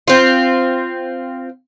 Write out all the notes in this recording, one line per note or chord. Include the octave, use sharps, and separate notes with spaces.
C4 F4